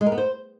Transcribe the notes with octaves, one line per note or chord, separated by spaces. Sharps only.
G#3
A#4
B3
C5